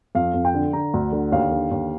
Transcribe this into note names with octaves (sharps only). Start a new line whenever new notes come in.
F2 F5
F2
G5
D3
D3 A#5
D2
D3
D#2 F5
D3
D#2